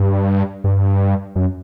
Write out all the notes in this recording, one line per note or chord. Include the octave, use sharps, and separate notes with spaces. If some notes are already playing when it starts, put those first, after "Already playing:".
Already playing: G2
G2
F#2